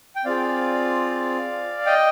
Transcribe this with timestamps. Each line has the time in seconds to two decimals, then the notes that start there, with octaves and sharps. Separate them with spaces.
0.16 G5
0.25 C4 F4 G#4 D5 F5
1.86 D#5 G5